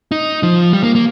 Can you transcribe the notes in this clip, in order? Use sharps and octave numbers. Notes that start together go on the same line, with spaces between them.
D#4
F3
G3
A#3
A#3